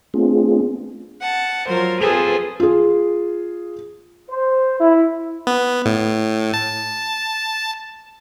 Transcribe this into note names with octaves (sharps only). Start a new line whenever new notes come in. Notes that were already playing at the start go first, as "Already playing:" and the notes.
A3 B3 C4 D4 F4 G#4
F#5 A5
F#3 F4 A#4 C5
C4 F4 G#4 A4 B4 C5
F4 G#4
C5
E4
B3
A2
A5